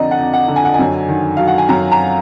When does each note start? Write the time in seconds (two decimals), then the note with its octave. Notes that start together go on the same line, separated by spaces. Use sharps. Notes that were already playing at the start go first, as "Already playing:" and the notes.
Already playing: F2 D3 F3 D5 D#5 A#5
0.11 F#5
0.18 F2
0.33 F#5
0.48 D3
0.56 G#5
0.65 F#5
0.74 G#5
0.79 F#2
1.08 D#3
1.37 F#3 F5
1.47 F#5
1.58 G#5
1.69 F#2 A#5
1.91 A#5